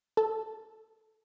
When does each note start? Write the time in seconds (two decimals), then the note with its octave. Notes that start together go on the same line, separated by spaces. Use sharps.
0.17 A4